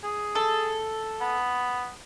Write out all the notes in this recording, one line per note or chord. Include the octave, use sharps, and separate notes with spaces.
G#4
A4
B3